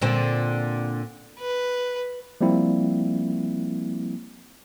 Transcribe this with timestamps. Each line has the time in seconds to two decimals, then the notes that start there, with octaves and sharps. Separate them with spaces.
0.02 A#2 D3 C4
1.40 B4
2.41 F3 G3 A#3 C4 E4